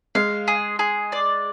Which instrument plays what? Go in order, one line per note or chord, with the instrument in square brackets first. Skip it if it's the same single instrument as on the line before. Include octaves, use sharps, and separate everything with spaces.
[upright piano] G#3 [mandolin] F5
[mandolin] G#4
G#4
D5